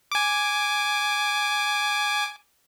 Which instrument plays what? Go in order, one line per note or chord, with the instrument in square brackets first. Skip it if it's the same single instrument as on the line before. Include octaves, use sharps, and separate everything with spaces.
[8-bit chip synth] G#5 D6